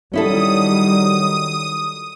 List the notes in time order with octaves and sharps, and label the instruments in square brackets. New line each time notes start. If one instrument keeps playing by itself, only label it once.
[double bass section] D#3 F#3 G3 [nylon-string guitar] C#4 E4 A4 [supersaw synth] D#6